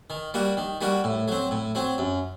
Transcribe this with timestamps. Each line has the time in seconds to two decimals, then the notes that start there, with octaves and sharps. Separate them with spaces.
0.10 D#3
0.34 G3 A#3 F#4
0.57 D#3
0.81 G3 A#3 F#4
1.04 A2
1.28 F#3 C4
1.51 A2
1.75 F#3 C4
1.98 F#2